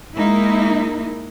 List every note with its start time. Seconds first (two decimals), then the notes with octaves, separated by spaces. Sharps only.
0.16 G#3 A#3 D#4 E4 A#4